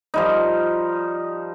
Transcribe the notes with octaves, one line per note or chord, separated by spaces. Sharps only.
F3 G3 D#4